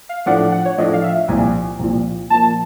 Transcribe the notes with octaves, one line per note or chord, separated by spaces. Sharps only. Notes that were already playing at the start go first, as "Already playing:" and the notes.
F5
A2 F3 A3 D4 F#5
F#5
C#5
A2 F3 A3 D4 D#5
F5
E5
C2 A#2 F3 G#5
C2 A#2 F3
A#2 F3 A#3 A5